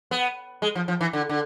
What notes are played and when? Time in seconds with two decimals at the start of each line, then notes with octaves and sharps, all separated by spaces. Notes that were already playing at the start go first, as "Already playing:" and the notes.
0.11 B3
0.62 G#3
0.75 F3
0.88 F3
1.01 E3
1.13 D3
1.29 D3